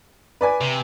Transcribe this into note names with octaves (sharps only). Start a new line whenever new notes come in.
B4 D5 G#5
C3